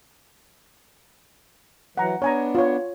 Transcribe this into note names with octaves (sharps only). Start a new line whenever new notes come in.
E3 F#3 F#5 A#5
B3 D4 C#5 G#5 A#5
F4 C#5